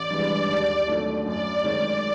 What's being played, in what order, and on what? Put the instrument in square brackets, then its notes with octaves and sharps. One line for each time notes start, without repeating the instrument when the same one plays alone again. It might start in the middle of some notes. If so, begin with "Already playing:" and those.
Already playing: [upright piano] A1 [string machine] D5
[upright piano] G2 E3 G#3
D#2
D#3 F#3 A3 D4
[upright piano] F#2 [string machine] D5
[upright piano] D#3 G#3 C#4